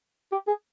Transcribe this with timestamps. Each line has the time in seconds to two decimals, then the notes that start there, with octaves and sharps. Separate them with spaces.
0.32 G4
0.47 G#4